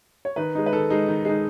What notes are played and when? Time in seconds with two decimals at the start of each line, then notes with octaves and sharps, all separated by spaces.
0.25 C#5
0.36 D#3 B4
0.55 G#3 D#4
0.66 B4
0.72 D#3 A4
0.90 G#3 D#4
1.08 D#3
1.25 G#3 D#4